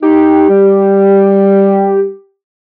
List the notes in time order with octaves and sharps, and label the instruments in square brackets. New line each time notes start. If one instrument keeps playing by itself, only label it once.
[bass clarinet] D#4 [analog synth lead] G4
[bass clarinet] G3